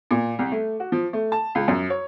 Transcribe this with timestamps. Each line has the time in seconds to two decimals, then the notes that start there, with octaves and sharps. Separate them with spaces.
0.11 A#2
0.39 C2
0.52 A3
0.80 F#4
0.92 F3
1.13 A3
1.32 A5
1.55 C#2
1.68 F#2
1.90 C#5